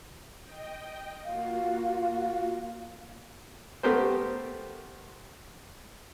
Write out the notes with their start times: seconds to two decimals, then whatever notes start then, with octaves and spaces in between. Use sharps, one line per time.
0.41 D#5 G5
1.25 A#3 F4 F#4 F5
3.83 A3 B3 G4 A#4 C5